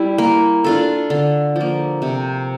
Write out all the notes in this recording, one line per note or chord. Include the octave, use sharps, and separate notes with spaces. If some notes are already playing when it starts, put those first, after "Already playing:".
Already playing: G3 E4
A#3
D4 F4 A4
D3
F3 A#3
C3